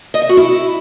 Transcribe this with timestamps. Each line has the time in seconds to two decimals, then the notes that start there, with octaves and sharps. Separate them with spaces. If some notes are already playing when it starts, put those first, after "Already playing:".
0.14 D#5
0.22 E5
0.29 F#4
0.37 E4